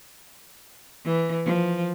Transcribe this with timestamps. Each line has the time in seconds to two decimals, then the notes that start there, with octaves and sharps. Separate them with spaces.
1.05 E3
1.45 F3